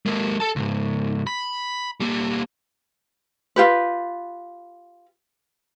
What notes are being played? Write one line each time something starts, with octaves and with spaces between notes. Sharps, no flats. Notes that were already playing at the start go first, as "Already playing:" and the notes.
G#3 A#3
A4 A5
C#2 G#2
B5
G3 A#3
F4 G4 B4